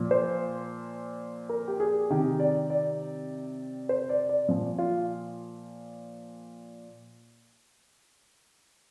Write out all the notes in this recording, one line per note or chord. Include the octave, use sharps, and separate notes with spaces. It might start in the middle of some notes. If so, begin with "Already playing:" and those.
Already playing: A#2 F3
C5
A#4
G4
G#4
C3 D#3 G4
D5
D5
C5
D5
D5
A#2 F3
F4